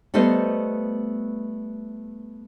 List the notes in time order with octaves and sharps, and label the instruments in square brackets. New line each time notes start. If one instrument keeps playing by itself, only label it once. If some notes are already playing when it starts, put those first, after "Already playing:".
[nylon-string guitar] G3 A3 B3 B4 C5 D#5